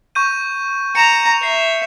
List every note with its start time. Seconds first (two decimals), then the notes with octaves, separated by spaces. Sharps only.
0.15 C#6 G6 D#7
0.95 A#5 C#7 E7 F7
1.43 E5 C7